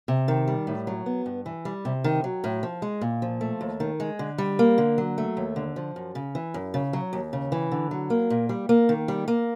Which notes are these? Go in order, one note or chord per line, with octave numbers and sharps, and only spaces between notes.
C3
D#3
G3
A2
F#3
B3
G2
E3
G3
C3
D#3
F#3
A2
F3
G#3
A#2
F3
A3
D#2
D#3
G#3
D3
G3
A#3
D3
F#3
A3
D#2
D3
F3
F#2
C#3
E3
F#2
C#3
F#3
D#2
C#3
E3
D3
F#3
A#3
A#2
G3
A#3
D#3
G3
A#3